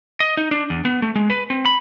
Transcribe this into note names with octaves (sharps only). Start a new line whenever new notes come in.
D#5
D#4
D4
E2
B3
A3
G#3
B4
C4
B5